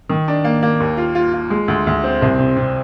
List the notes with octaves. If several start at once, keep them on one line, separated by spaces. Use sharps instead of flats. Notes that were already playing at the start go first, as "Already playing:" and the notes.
D#3
D4
A#3
A#3
D#2
F4
F4
F4
G#3
D2
D2
C4
C2
C3
C3